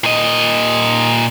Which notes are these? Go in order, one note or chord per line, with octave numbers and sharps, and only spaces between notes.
A#2 D#5